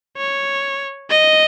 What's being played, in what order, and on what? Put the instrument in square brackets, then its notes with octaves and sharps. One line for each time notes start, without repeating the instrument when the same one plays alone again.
[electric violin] C#5
D#5